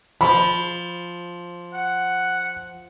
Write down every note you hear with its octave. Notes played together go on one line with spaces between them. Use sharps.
F3 B5
F#5